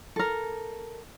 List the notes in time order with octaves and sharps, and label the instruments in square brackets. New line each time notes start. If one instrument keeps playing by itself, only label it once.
[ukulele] A4 A#4